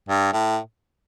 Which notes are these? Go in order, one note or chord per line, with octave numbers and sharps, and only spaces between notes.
G2
A2